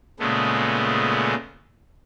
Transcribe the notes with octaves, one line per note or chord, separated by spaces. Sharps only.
A#2 C#3 G#3 A3 B3